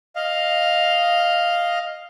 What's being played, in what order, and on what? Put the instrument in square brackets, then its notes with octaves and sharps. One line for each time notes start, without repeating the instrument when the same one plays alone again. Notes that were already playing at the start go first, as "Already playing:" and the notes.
[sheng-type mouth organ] D#5 F5